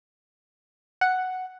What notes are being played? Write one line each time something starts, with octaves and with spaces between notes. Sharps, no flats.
F#5